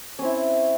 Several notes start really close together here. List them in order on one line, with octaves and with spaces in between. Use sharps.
C#4 C4 E4